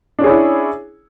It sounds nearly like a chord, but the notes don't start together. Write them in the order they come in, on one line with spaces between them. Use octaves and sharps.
D4 C#4 G#4 C#5 E4